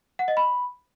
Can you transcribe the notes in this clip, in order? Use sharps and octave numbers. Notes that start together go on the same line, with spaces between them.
F#5
D#5
B5